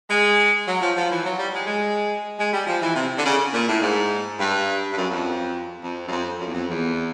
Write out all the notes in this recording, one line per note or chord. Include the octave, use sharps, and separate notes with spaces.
G#3
F#3
F3
F3
E3
F#3
G3
G#3
G#3
G#3
G3
F3
E3
C3
D3
C#3
A#2
A2
G#2
G2
G2
F#2
F2
F2
F#2
F2
F#2
E2
F2
E2